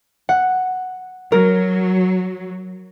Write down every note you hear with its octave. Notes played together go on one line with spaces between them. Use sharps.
F#5
F#3 A#4